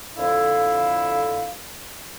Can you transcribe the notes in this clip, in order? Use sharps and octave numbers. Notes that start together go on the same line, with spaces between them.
F2 D3 E4 F5